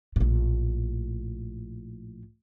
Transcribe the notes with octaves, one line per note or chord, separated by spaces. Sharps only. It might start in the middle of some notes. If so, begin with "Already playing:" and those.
A#1 A2